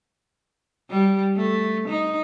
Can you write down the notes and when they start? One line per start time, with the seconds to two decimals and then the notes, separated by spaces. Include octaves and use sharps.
0.90 G3
1.36 A3
1.88 D#4